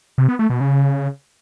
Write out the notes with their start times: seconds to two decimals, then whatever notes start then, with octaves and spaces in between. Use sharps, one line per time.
0.18 C3
0.29 B3
0.39 A3
0.50 B2
0.60 C#3